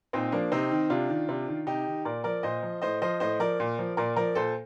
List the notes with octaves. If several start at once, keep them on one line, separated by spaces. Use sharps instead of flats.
A#2 C4 D#4
F3 A#3 D4
C3 C4 D#4
D#3
C3 D4 F4
D#3
C3
D#3
C3 D#4 G4
D#3
A#2 A#4 D5
F3 A#4 D5
A#2 C5 D#5
F3
A2 C5 D#5
F3 C5 D#5
A2 C5 D#5
F3 A#4 D5
A#2
F3
A#2 A#4 D5
F3 A#4 D5
A#2 A4 C5